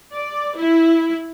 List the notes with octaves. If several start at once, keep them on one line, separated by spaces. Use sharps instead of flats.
D5
E4